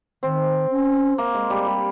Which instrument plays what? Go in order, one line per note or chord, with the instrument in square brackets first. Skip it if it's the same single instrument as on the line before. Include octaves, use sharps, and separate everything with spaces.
[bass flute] D#3 [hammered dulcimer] C4
[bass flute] C#4
[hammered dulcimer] A#3
G#3
G3
G3